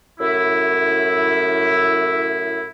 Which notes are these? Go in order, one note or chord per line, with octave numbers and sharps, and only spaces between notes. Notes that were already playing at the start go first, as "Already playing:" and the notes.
F#2 A2 E4